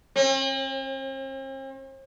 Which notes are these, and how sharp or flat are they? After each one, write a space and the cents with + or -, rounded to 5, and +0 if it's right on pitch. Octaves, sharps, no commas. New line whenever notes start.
C4 +45